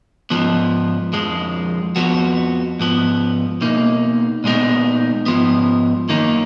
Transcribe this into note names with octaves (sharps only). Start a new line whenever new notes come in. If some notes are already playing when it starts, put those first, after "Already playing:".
G#2 F3 B3
F2 F3 G#3
F2 F3 B3 F#4
G#2 F3 B3
B2 A#3 D#4
A#2 G#3 B3 D#4
G#2 F3 B3
F#2 D#3 A#3 D#4